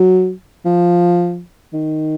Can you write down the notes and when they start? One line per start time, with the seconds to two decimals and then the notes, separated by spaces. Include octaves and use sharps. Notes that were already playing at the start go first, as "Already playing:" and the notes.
Already playing: F#3
0.65 F3
1.73 D#3